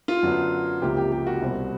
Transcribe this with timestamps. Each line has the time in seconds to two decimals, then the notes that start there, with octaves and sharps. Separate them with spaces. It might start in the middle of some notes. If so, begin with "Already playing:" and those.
0.08 F4
0.23 F#2 D3 F#3 B3
0.82 C#2 C3 F3 A#3 G4
0.97 G4
1.12 G4
1.27 F#4
1.41 C2 B2 G3 C4